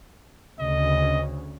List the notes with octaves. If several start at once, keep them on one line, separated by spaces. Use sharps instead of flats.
D2 C#3 D#5